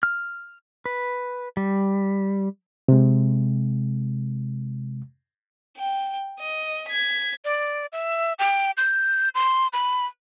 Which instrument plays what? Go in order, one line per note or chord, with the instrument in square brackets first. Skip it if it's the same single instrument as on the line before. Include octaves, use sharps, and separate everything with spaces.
[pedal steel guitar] F6
B4
G3
[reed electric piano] C3 G#3
[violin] G5
D#5
G#6 B6
[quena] D5
E5
G5
G6
C6
B5